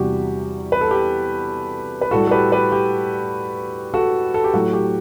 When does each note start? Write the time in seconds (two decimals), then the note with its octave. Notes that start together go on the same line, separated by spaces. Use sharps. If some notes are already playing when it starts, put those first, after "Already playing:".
Already playing: E2 C3 G3 F#4 G4
0.72 B4
0.81 A4
0.91 G4
2.01 B4
2.11 A2 G3 F#4 A4
2.27 A4
2.31 G4 B4
2.52 G4 B4
2.72 G4
3.94 F#4 A4
4.34 A4
4.44 G4
4.53 A2 F#3 A3 F#4
4.73 G4